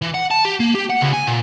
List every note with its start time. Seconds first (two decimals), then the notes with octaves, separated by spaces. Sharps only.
0.02 E3
0.14 F#5
0.31 A5
0.45 G4
0.60 A#3
0.75 G4
0.90 F#5
1.02 C#2
1.14 G#5
1.28 A#2